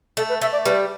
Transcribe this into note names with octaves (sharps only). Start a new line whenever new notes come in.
A3 A4
B4
A3 E5
D5
G3 B4